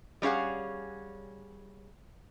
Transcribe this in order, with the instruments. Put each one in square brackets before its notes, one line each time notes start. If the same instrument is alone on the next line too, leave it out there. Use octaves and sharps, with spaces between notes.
[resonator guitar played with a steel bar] G3 C#4 G#4 F5 F#5